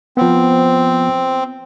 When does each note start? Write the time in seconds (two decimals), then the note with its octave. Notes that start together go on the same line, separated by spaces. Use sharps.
0.17 F3 B3 C4